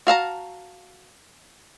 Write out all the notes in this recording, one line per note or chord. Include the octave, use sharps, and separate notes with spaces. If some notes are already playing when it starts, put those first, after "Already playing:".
F#4 F5 A5 A#5